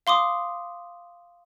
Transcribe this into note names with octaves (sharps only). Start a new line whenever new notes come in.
F5 C6 D6 D#6